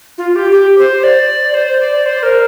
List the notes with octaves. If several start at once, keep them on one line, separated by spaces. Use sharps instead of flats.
F4
G4
G4
C5
D5
C5
D5
C5
A#4